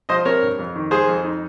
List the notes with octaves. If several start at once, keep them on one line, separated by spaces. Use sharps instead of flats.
F3 C5 D#5
C4 A#4 C#5
G2
F2
D#3
G#3 G#4 C5
F2
D#4